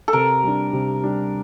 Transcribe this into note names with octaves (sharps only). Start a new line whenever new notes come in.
A4
C3 A#4
G3 D4
C3
G3 D4